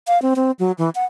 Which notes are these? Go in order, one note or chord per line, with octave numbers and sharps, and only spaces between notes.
F5
C4
C4
F#3
E3
F#5